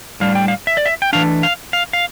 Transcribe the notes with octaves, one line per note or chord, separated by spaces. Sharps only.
A2 G3 D4 F5
G5
F5
E5
D5
E5
G5
E3 A3 D4 F5
F5
F5
F5